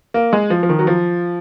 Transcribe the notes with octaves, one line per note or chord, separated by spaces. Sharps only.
A#3
G#3
F3
F3
D#3
F#3
F3